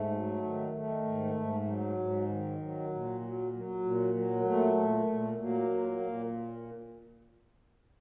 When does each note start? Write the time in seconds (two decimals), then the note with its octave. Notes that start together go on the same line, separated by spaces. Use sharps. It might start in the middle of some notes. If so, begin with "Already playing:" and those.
Already playing: G#2 A3
0.11 F#3
0.42 D#3
0.73 D#3 A3
1.04 G#2
1.35 G#2
1.66 F#3
1.97 G#2
2.28 D#3
2.59 F#3
2.90 A#2
3.21 F#3
3.52 F#3
3.83 A#2
4.14 F#3
4.44 A#2 A3
4.76 A#2
5.07 A#2
5.38 A#2 F#3 A#3
5.69 A#2
6.00 A#2